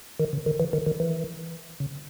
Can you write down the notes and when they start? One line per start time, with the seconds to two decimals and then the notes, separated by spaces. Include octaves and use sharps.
0.20 D#3
0.33 C#3
0.46 D#3
0.60 E3
0.73 D#3
0.86 D#3
1.00 E3
1.80 C#3